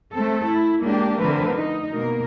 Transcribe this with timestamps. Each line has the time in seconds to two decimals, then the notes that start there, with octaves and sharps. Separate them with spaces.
0.13 A3 C4 A4
0.46 E4
0.82 G#3 A#3 D4 G4
1.19 D3 F3 A3 C4 A#4 B4
1.56 D#4
1.93 B2 A#3 A#4